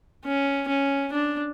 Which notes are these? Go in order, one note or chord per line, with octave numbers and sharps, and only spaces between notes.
C#4
C#4
D4